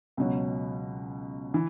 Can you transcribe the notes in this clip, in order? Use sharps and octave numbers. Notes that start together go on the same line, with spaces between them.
C#2 B2 F#3
E3